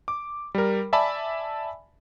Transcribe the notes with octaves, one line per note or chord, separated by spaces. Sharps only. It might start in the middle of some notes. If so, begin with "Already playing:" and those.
D6
G3 A#4
D5 E5 G#5 A5 B5